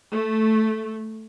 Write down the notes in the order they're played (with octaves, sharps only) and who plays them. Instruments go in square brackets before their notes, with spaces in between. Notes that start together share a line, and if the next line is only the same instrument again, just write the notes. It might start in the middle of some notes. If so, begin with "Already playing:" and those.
[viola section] A3